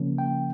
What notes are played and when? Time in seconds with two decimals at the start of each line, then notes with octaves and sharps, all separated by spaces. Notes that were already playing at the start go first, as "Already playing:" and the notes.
Already playing: C#3 F3 A#3 C#4
0.18 G5